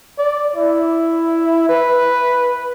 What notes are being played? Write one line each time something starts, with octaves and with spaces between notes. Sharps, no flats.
D5
E4
B4